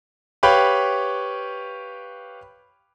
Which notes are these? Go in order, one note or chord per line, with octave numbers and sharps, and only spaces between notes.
G4 B4 C#5 F5 G5 B5